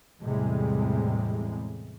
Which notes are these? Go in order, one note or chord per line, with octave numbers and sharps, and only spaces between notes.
E2 A2 C3 G3 G#3